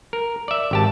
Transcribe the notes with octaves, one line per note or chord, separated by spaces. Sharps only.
A#4
D5 E5
G#1 G4 A5